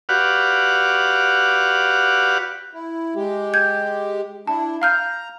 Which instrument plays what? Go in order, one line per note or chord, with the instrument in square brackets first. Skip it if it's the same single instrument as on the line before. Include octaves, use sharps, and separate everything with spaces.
[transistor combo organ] F#4 G4 B4 D5 F5 F#5
[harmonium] E4
G#3 G4
[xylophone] G6 G#6
[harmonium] D4 E4 [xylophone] A5
[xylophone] F5 F6 G6 [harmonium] A#5